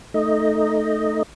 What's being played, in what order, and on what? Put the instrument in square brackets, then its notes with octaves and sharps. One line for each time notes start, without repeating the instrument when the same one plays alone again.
[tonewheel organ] A3 D#4 D#5